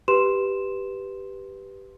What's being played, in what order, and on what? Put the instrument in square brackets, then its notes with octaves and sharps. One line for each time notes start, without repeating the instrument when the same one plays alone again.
[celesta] G4 B4 C6 E7